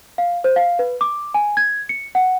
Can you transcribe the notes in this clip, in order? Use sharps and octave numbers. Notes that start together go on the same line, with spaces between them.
F5
C5
F5
B4
D6
G#5
G#6
C#7
F#5